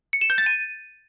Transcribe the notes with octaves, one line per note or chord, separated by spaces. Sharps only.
C#7
E7
G6
A6
D#7